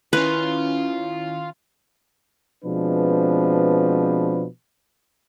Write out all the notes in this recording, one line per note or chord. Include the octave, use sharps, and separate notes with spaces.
D#3 C#4 E4 F4 B4
B2 F3 G#3 C4 D4 B4